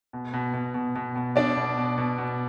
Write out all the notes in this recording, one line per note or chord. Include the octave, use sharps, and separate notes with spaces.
B2
B2
B2
B2
B2
B2
B2 D4 D5
B2
B2
B2
B2